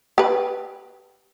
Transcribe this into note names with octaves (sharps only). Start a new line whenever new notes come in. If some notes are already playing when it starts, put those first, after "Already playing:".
G4 B4